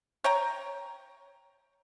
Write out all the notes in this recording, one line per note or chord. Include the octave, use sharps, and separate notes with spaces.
C#5 G5 A#5